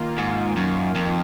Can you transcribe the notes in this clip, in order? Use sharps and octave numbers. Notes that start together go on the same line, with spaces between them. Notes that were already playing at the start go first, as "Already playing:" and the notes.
Already playing: D#3 A#3 F4
G#2
F#2
F2